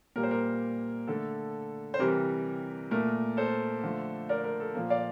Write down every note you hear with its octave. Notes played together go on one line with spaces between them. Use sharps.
A#2 G3 A#3 A#4
C5
A#4
D3 A3 A4
C5
C3 E3 G3 A#4
A#2 A3 A#4
A4 C5
D3 F3 A3
A#4 D5
A#4
A4
A#2 F3 A#3
D5 F5